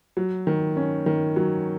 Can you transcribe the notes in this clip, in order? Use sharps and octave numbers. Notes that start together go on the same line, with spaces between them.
F#3
D#3
C#4
D#3
F#3